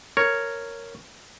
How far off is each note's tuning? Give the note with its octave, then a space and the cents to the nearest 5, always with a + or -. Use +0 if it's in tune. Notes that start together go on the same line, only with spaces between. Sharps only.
A#4 -10 C#5 +0